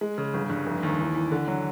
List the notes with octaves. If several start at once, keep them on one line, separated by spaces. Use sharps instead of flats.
G#3
C#3
G1
G2
F1
D#2
E3
E3
D3
F#3